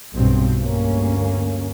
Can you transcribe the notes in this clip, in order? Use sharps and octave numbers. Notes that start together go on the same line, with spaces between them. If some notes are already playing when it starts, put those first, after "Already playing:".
B1 G2 B2 C4
D2 G2 A#3 C#4